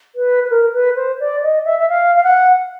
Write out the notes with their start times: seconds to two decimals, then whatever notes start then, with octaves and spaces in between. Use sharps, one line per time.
0.15 B4
0.44 B4
0.50 A#4
0.73 B4
0.95 C5
1.20 D5
1.43 D#5
1.64 E5
1.78 E5
1.89 F5
2.15 F5
2.23 F#5